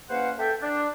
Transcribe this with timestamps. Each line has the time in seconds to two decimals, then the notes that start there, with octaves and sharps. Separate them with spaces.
0.10 E2 A#3 C#4 B4 C5 F#5
0.39 A4 E5 G5
0.61 D4